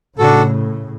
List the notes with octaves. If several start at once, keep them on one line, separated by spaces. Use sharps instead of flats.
A2 C#3 D4 F#4 A4